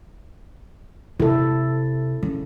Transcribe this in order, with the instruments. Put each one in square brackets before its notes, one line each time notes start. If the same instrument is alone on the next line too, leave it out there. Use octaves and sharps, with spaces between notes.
[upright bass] C3 [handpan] E4 A4
[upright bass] C#3